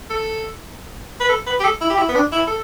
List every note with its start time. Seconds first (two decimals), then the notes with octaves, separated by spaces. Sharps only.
0.10 A4
1.21 B4
1.29 A4
1.47 B4
1.60 G4
1.64 A4
1.81 E4
1.90 G4
1.98 E4
2.09 B3
2.15 D4
2.32 E4
2.47 A4